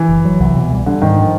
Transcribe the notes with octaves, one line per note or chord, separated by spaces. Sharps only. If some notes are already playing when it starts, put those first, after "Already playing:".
Already playing: E3
F#1
F#3
C2
B2
G3
D3 G3
G#2 D#3
F3